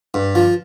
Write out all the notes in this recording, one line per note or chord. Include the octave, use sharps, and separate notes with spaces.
G2
F3